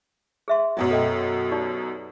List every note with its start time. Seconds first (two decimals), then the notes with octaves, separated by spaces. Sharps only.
0.48 G#4 E5 C6
0.77 F#2 B2 F#3
0.91 A4 D#5 G5
1.52 D#4 G4 D5